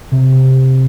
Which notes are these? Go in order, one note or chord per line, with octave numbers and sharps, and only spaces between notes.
C3